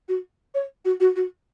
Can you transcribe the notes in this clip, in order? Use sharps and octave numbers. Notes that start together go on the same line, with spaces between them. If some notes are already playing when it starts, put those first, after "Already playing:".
F#4
C#5
F#4
F#4
F#4